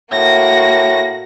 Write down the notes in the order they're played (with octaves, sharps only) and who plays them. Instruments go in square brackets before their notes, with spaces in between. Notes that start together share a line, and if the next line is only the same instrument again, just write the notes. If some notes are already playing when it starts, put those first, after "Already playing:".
[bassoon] A2 [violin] A#3 F#4 [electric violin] A#6